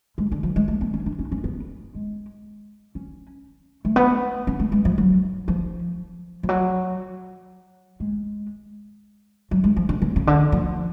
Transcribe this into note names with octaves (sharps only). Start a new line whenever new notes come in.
G#3
D3
F3
G#3
A3
B3
C#4
D4
C#4
C#4
B3
G#3
C#4
A3
B3
C#4
A3
G#3
F3
F#3
F3
F3
F#3
G#3
F#3
G#3
F3
D3
C#3
C#3
D3
F3